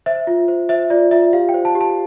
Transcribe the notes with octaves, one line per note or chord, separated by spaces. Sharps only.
C5 E5
F4
C5
C5 E5
F4 D5
F4 E5
G4 F5
G5
C5
A5
G4
A5